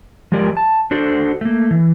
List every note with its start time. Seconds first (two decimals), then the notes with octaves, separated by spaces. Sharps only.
0.32 F3 G#3 G4 A#4 D5
0.57 A5
0.91 D4 F#4 A4 C5 D5
1.41 A3 A#3
1.71 E3